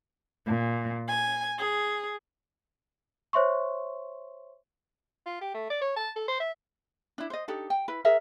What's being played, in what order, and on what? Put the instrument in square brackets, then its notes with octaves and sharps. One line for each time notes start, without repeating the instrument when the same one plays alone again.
[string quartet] A#2
G#5
G#4
[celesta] C5 C#5 E5 C6 C#6
[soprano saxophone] F4
G4
A3
D5
C#5
A5
A4
C5
E5
[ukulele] D4 E4
C5 D#5
D4 D#4 G4 A4
G5
E4 B4
G#4 A#4 E5